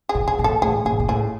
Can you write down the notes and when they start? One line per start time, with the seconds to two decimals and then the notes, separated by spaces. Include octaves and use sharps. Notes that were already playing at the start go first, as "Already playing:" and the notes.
0.09 G#4
0.15 A#2
0.28 G#4
0.39 A#2
0.44 A4
0.62 A2 G#4
0.85 A#2 G#4
0.99 A#2
1.08 A2 G#4